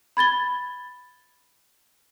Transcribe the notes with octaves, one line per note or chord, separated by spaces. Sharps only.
B5 G#6 A6 G7